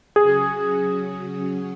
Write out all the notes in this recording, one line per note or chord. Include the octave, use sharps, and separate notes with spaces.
C#3 F#3 C#4 F#4 G#4